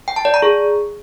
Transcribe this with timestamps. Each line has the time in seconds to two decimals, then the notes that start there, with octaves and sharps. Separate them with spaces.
0.08 G5
0.16 A5
0.25 D5
0.34 A#5
0.42 G#4